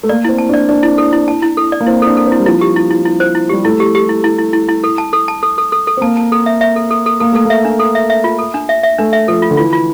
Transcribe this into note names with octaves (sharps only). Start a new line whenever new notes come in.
A3
A#3 D5
C4 E4
A5
D4
D5
D4 D5
E4
A4
E4
A5
E4
A4
D5
A#3
C4 E4
D4 A4
A4
C4
E4
G3
F3 E4
G4
E4
E4
E4
C5
E4
G3 G4
A3 E4
G4
G4
E4
E4
E4
E4
E4
A4
A5
A4
A5
A4
A4
A4
A4
C4
A#3 A5
A5
A4
E5
E5
A4
A4
A4
A#3 A4
A3 A4
A#3 E5
D4
A4
E5
E5
F4
A4
D4
E5
E5
A3 D4
E5
F3 A4
F4
D3
E3 F4
F4